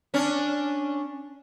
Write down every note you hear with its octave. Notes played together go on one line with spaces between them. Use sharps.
C#4 D4